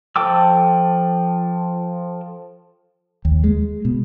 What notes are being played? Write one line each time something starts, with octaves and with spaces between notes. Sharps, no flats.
F3 A4 G5 D6 E6
D#2
G#3
B2